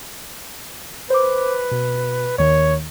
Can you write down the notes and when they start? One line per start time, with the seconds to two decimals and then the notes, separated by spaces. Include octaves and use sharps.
1.10 B4 C5 D6
1.71 B2
2.38 D#2 D#3 C#5